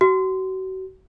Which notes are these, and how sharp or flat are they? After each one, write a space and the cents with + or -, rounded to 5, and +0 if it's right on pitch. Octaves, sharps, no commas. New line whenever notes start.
F#4 +35